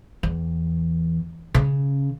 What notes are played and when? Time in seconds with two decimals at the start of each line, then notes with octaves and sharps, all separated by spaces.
0.23 E2
1.54 C#3